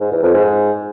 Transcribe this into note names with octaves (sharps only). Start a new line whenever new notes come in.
G#2
E2
F2
G#2